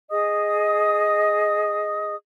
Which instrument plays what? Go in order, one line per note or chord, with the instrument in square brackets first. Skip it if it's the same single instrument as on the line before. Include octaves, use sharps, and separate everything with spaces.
[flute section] G#4 D#5 D#6